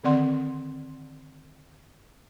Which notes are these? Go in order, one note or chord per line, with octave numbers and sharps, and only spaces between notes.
D3 D#3 C4 D5 F#5 C6